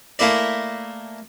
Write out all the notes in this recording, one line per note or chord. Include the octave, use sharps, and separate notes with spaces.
A3 A#3 E4 D5